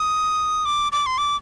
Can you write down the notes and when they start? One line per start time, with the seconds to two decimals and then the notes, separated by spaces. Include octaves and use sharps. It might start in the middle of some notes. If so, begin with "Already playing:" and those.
Already playing: D#6
0.65 D6
0.92 D6
1.06 C6
1.18 D6